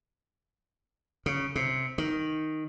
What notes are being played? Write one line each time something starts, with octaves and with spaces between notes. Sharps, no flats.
C#3
C3
D#3